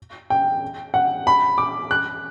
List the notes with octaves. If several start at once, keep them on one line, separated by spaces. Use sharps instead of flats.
G5
F#5
B5
D6
F#6